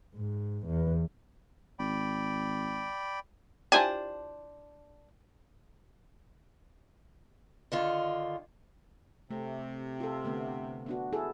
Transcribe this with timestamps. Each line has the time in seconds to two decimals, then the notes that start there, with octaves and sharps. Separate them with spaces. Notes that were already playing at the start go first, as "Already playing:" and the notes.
0.15 G#2
0.67 E2
1.79 G#1 D5 G5 B5
3.72 D4 E4 F4 G4 C5 G#5 A5
7.72 D3 D#3 F4
9.31 C3 A3
10.00 F4 A4
10.25 D3 A3 B3
10.86 B3 D4 F#4
11.13 E4 G#4 A4